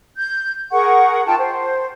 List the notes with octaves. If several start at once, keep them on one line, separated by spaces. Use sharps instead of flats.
G6
G#4 A#4 F#5 C#6
D#4 F4 G5 A5
C5